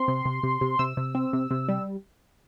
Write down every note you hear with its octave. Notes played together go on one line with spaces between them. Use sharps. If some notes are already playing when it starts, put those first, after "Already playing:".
Already playing: C4 C6
C3
C3
C3
C3
C3 E6
C3
C4
C3
C3
G3